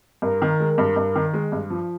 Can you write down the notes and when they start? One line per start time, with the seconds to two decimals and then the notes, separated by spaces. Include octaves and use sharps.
0.22 G2 A#4
0.42 D#3
0.60 G#3
0.78 G2
0.96 G2
1.16 D#3
1.34 G#3
1.52 G2
1.70 F3